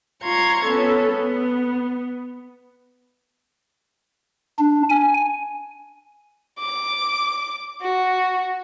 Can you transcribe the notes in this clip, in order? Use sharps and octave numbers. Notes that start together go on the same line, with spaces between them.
F4 A#5 C6 C#6 G#6
B3 C#4 A4
B3
D4
G#5
D6
F#4